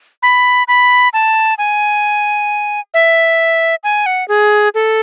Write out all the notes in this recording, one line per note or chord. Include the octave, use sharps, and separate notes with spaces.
B5
B5
A5
G#5
E5
G#5
F#5
G#4
A4